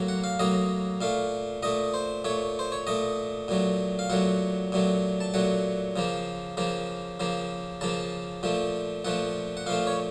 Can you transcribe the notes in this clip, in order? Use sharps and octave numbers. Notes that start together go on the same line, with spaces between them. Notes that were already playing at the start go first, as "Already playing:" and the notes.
Already playing: A2 F#3 A#3
F#5
F5
A2 F#3 A#3 D#5
A#2 A3 F5
A#2 A3 D#5
C5
A#2 A3 C#5
C5
C#5
A#2 A3 D#5
A#2 F#3 A3
F5
A#2 F#3 A3 F#5
A#2 F#3 A3
A5
A#2 F#3 A3 F#5
C#3 F3 A#3
C#3 F3 A#3
C#3 F3 A#3
C#3 F3 A#3 A5
A#2 F3 A3
A#2 F3 A3 F#5
F#5
A#2 F3 A3 F5
C#5